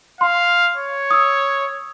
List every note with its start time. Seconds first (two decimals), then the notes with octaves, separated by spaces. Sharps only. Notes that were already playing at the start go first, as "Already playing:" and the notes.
0.21 F5 C6
0.76 C#5
1.11 D#6 E6